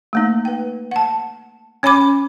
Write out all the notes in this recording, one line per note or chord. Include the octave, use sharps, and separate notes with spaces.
A3 A#3 D#4
B4 G5
F#5 A5
C#4 C#5 G#5 B5 D6